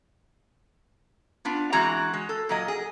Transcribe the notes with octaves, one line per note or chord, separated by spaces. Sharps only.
B3 D4 F4
E3 G#3 C4 F#4 F#5 A#5
G#3
A4
A#2 F#3 D#5
G#4